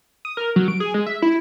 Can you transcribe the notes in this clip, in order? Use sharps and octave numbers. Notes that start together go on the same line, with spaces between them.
D#6
A#4
F#3
D7
G#4
G#3
E5
E4